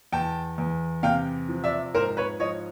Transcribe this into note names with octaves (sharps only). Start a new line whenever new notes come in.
E2 G5 A5
E2
C3 F5 G5
F3
D5 E5
G#2 A#4 C5
B4 C#5
F3 C#5 D#5